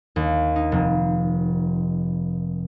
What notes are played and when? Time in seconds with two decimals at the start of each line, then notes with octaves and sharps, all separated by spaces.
0.16 D#2
0.56 D#4
0.72 F1